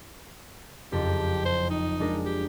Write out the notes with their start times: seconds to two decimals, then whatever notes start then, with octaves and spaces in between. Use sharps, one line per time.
0.92 F#1 F2 G4
1.45 C5
1.70 D#4
2.00 G#3 D4 A#4
2.26 G4